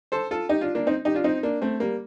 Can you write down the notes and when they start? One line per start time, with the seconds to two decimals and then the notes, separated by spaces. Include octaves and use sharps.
0.12 A4 C5
0.31 F4 A4
0.49 D#4 G4
0.61 D4 F4
0.75 A#3 D4
0.87 C4 D#4
1.05 D#4 G4
1.14 D4 F4
1.24 C4 D#4
1.43 A#3 D4
1.62 A3 C4
1.80 G3 A#3